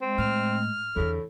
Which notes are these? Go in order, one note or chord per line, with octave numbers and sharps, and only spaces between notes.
G#3 C4
A2 F6
E2 A2 D3